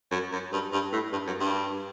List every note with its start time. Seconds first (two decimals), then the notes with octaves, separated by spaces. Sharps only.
0.11 F#2
0.32 F#2
0.52 G2
0.72 G2
0.92 A2
1.12 G2
1.27 F#2
1.40 G2